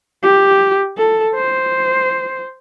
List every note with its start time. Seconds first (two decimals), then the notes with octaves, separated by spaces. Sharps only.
0.23 G4
0.97 A4
1.35 C5